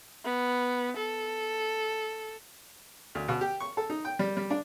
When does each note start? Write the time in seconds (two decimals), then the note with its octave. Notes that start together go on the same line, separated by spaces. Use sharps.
0.25 B3
0.97 A4
3.15 D2
3.28 B2
3.41 G4
3.60 C#6
3.77 A4
3.90 D#4
4.05 G5
4.19 G3
4.37 G3
4.50 D4